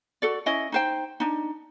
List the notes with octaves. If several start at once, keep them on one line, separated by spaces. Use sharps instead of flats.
F#4 A4 D5
C#4 E4 D#5
D#4 C5 G5
D4 D#4